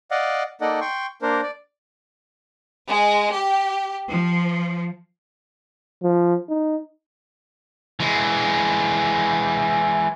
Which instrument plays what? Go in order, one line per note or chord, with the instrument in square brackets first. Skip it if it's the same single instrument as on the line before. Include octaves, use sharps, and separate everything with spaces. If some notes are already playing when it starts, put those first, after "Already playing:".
[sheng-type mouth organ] D5 D#5 F5 F#5
A#3 D#4 A4 D5 D#5 F#5
G5 C6 C#6
A#3 D4 A#4 C5
D5
[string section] G#3
G4
F3
[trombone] F3
D#4
[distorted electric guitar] E3 G#3